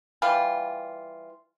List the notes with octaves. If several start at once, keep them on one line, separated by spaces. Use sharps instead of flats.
E3 G3 F4